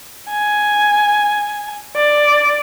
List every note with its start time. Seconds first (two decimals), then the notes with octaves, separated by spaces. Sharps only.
0.30 G#5
1.96 D5